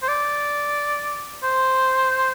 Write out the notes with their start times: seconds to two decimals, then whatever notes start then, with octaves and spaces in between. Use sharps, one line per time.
0.03 C5
0.08 D5
1.44 C5